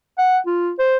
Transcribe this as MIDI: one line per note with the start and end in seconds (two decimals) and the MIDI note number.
0.19 0.38 78
0.46 0.72 65
0.79 0.97 72